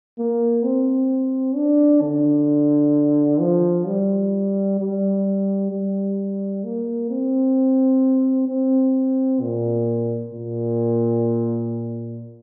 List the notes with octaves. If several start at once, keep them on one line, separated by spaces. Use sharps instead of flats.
A#3
C4
D4
D3
F3
G3
G3
G3
A#3
C4
C4
A#2
A#2